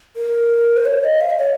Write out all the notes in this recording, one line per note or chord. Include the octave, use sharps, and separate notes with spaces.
A#4
C5
C#5
D#5
F5
D#5
C#5